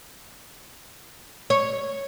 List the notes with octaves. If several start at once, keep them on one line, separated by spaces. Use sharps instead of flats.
C#5